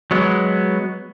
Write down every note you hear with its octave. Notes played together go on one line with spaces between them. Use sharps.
F#3 G#3 B3